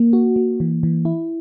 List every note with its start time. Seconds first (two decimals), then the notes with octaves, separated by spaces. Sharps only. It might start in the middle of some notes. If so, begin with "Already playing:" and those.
Already playing: A#3
0.13 F#4
0.36 A#3
0.60 E3
0.83 E3
1.05 E4